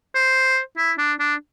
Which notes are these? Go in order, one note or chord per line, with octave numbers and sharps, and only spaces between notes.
C5
E4
D4
D4